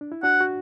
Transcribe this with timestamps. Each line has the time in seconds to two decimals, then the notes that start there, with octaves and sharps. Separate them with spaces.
0.01 D4
0.12 E4
0.23 D4 F#4 F#5
0.40 F#4